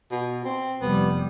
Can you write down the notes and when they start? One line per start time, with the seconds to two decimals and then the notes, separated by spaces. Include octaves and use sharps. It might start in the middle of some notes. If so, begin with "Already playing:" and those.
0.12 B2
0.45 C4
0.82 F1 G3 B3